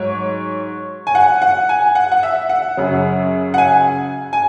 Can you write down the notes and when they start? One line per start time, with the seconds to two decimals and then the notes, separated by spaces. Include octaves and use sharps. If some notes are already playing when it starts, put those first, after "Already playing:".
Already playing: G#2 F#3 C#5
1.07 G#5
1.15 F#5
1.42 F#5
1.69 G#5
1.95 F#5
2.12 F#5
2.23 E5
2.49 F#5
2.77 F#2 C#3 F#3
3.54 F#5
3.58 G#5
4.33 G#5